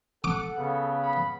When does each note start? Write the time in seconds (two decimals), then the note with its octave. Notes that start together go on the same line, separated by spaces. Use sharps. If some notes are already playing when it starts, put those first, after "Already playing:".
0.24 A4 F#5 D6
0.57 C#3 B3
1.03 B5